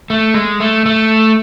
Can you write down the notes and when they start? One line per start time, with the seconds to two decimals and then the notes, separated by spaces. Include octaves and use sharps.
0.10 A3
0.34 G#3
0.60 A3
0.86 A3